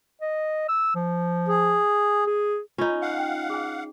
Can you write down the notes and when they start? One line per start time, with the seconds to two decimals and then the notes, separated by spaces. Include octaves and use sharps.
0.21 D#5
0.68 E6
0.95 F3
1.48 G#4
2.27 G#4
2.78 C#4 D#4 F4
3.02 F5 F#5
3.18 G5
3.50 G#4 G#5